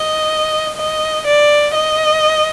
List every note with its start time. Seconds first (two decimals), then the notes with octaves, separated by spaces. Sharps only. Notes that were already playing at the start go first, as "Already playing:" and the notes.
Already playing: D#5
0.77 D#5
1.27 D5
1.75 D#5